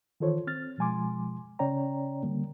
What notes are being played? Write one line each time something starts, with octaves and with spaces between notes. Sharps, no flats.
D#3 E3 F4 A4 C5 C#5
C4 F6 A6
B2 F3 G#3 G#5 C6 D6
C#3 C#4 C#5 D5 G5 A#5
D3 G3 A#3